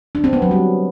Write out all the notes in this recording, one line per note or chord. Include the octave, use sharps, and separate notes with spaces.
D4
C4
B3
F#3
G3